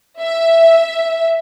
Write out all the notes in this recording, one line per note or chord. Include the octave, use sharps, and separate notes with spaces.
E5